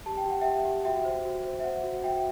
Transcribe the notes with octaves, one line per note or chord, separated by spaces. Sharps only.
G4 A5
G5
G4 F#5
G4 E5 G5
G4
F#4 E5 G5
C5
F#4
C5
E5
C5 F#5
F#4
F#4 E5 G5